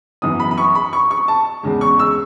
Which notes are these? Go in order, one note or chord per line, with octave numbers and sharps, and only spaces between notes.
F#2 E3 B3 D#6
B5
B5
C#6
B5
C#6
C#6
A5
E2 C#3 G#3
C#6
E6